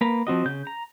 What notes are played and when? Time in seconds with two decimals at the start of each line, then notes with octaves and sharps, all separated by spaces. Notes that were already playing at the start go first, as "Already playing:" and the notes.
0.01 A#3 B4 A#5
0.27 F3 C4 F#4 D#5
0.45 C#3 G6
0.67 A#5